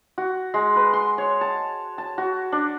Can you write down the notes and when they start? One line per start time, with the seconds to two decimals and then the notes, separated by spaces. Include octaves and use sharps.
0.18 F#4
0.54 G#3
0.76 B4
0.93 C6
1.18 C#5
1.41 A5
1.98 A5
2.18 F#4
2.52 D4